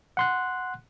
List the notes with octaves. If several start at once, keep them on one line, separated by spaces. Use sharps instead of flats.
F#5 C6 F#6